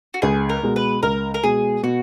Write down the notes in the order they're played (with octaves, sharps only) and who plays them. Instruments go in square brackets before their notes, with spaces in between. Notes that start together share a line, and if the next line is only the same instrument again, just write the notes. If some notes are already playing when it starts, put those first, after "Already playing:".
[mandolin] F#4
[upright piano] C#2 [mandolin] G#4
[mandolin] A#4
[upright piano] B2 G#3
[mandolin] B4
[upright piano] C#2 [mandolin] A#4
[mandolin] A#4
[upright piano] B2 G#3 [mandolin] G#4
[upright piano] B2 [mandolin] F#4